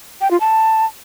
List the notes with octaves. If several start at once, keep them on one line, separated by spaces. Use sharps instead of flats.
G5
F4
A5